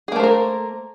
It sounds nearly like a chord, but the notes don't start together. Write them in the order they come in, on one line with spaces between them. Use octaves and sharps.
G#4 A#3 A3 C5 A#4